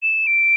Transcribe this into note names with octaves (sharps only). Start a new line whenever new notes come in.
E7
D7